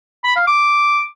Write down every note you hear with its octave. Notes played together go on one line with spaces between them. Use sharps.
B5
F5
D6